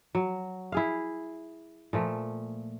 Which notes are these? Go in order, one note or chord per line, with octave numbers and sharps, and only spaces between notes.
F#3
E4 G#4 F5
A#2 F3 A3